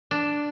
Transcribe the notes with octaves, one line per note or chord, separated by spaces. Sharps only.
D4